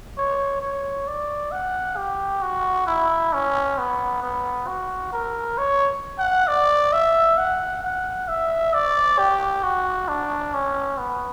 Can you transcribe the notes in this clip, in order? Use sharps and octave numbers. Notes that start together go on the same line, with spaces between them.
C#5
C#5
D5
F#5
G4
F#4
E4
C#4
B3
B3
F#4
A#4
C#5
F#5
D5
E5
F#5
F#5
E5
D5
G4
F#4
D4
C#4
B3